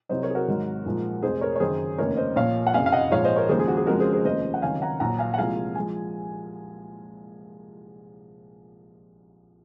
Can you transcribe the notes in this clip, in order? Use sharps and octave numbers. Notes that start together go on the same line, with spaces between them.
C2 C3 F#3 C5 D#5
A#4 C#5
G#4
F#4 A#4
G#1 G#2 F#3
A#1 G#2 F3 G#3
F1 F2 C3 G#4 C5
A#4 C#5
C#5
F#1 F#2 D#3 F#3 G#4 C5
F1 D#2 C#3 A#4 C#5
C5 D#5
A#1 A#2 F3 C#5 F5
F#5
F#1 F2 C3 F5 G#5
F5
D#5 F#5
A#1 G#2 F3 G#3 C#5 F5
C5 D#5
A#4 C#5
D#2 C#3 F3 G#3 G#4 C5
G#4
F#4
G#4
F2 C#3 F3 G#3 F#4 A#4
G#4 C5
G#4 C5
F1 D#2 C#3 F3 C5 D#5
F#5
C#2 C3 D#3 F#3 F5 G#5
F#5 A#5
A#1 A#2 F#3 F#5 A#5
F5 G#5
F#5
C2 A#2 F3 G#3 F5 G#5
F3 G#3 G#5